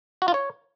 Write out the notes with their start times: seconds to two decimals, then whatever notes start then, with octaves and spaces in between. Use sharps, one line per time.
0.22 F#4
0.28 F4
0.34 C#5